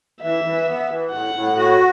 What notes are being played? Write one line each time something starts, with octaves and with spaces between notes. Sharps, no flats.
E3 E5
E3
B3
E3
A2 F#5
A2
F#4